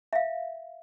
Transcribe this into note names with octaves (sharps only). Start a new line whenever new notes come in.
E5 F5